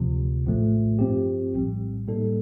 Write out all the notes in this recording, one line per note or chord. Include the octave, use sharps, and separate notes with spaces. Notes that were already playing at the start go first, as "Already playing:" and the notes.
Already playing: D2 C3 F3
A#1 A2 F3 A3
G2 F3 C4 G4
A#1 A2 G3
A2 G3 A#3 D#4 A4